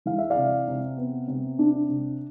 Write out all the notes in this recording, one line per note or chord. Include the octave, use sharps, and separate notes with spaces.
E3 F5
E5
D5 F5
C3
C3
B3
C3
D4
C3